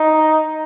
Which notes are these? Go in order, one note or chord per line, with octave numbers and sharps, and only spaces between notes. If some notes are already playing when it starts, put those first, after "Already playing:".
Already playing: D#4